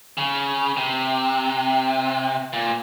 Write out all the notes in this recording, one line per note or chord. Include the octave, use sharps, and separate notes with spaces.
C#3
C3
A#2